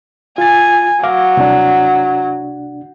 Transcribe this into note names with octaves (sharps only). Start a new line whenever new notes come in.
F4 G#5 A6
F#3 F5 D6
C2 D4